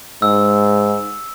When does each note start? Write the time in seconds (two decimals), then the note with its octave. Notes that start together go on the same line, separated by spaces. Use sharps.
0.22 G#2 E6